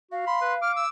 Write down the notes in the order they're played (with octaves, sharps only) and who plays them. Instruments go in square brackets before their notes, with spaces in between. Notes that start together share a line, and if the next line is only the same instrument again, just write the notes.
[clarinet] F#4 [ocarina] F5
[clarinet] B5 [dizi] C6
[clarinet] B4
[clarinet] D6 [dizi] F6
[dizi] E6